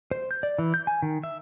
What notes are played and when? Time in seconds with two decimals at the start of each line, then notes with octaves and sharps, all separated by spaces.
0.11 C5
0.31 G6
0.43 D5
0.59 E3
0.74 G6
0.87 G#5
1.02 D#3
1.23 E5